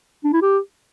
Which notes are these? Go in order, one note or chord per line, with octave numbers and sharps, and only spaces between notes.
D4
E4
G4